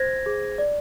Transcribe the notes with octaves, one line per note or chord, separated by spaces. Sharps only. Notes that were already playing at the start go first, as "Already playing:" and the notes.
Already playing: C5 G#6 A#6
G#4
D5